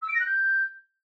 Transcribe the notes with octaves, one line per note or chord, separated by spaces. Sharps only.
E6
D7
A#6
F#6
G6